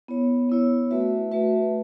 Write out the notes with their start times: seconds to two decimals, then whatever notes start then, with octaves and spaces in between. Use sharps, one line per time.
0.08 B3 E4 C#5
0.49 B3 E4 C#5
0.91 A3 F#4 B4 E5
1.32 A3 F#4 B4 E5